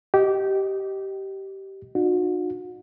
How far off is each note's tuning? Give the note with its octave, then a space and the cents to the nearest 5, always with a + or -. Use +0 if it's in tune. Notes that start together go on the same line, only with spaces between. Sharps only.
G4 -15 D#5 +0
D#4 -45 F#4 -40